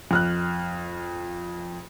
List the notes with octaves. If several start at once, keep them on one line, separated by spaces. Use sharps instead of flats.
F2 F6 F#6